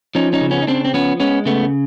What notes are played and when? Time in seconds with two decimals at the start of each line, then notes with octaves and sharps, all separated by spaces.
0.15 F3 C#4 D#4
0.33 C#4 D#4
0.41 C#3
0.51 B3 C#4
0.62 D#4
0.67 C#3 C4 D4
0.85 C4
0.93 F3 B3 C#4
1.20 G#3 B3 C#4
1.46 C#3 A3 B3